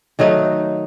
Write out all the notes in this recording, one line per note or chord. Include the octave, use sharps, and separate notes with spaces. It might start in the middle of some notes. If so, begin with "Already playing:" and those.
D#3 F#3 A3 D#4